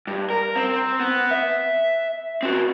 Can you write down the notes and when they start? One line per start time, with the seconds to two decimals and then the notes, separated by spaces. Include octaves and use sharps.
0.07 G2
0.30 A#4
0.56 C4
1.00 B3
1.31 E5
2.43 C4 F#4